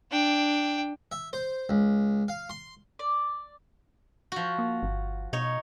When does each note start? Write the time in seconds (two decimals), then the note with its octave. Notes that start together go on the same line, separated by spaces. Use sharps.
0.11 D4 G5
1.12 E5
1.33 C5
1.69 C#2
2.28 F5
2.50 C6
2.99 D5
4.32 F3 F#4
4.59 A#3
4.83 G1
5.33 B2 D#4 C#5